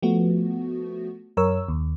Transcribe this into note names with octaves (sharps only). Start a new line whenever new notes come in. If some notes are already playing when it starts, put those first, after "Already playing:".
F3 A3 B3 F#4
F#2 A#4 C#5 E6
D#2